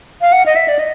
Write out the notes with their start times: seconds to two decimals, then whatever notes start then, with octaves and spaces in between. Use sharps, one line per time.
0.21 F5
0.32 F#5
0.46 D#5
0.56 E5
0.68 D5
0.79 D#5